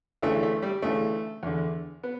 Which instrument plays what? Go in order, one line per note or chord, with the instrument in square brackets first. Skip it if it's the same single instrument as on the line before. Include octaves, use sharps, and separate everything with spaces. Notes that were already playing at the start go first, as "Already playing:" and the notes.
[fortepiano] D2 C#3 E3 A3
A3
G3
D2 C#3 E3 A3
E2 D3
B3